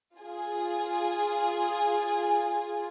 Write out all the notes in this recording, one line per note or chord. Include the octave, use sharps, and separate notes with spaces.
F4 G#4